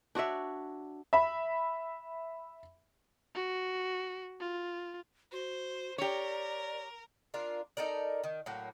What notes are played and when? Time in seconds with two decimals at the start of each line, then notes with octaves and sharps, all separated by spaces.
0.15 D4 F#4 C#5 E5
1.13 E5 B5
3.35 F#4
4.40 F4
5.32 F#4 C5
5.98 G4 A#4 C#5 D5
7.34 D4 F4 A#4
7.77 D#4 A4 A#4 D5
8.24 D#3
8.46 A2 F#3 A#3